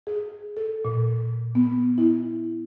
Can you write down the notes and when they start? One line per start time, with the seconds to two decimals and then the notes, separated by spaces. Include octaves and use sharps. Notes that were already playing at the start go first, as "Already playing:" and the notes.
0.07 G#4
0.57 A4
0.85 A#2
1.55 B3
1.98 E4